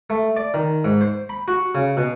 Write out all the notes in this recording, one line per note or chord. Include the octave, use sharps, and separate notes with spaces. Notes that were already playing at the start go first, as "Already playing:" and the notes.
A3
D5
D#3
G#2
C5
B5
F#4
C#3
B2